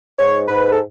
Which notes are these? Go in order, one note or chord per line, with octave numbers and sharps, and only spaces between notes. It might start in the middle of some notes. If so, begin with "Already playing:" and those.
G#2 C#5
G#2 B4
A4